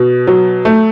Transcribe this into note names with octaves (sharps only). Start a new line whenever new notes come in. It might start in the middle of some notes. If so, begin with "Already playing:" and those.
Already playing: B2
F#3
A3